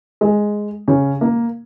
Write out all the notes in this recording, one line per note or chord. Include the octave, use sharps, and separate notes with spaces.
G#3
C#3 C#4
A#3